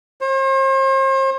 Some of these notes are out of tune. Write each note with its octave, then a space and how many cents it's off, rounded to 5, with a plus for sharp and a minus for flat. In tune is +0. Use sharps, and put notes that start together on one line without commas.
C5 +40